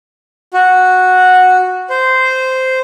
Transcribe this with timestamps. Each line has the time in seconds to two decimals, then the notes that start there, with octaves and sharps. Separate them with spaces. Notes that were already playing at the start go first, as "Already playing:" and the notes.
0.54 F#4
1.90 C5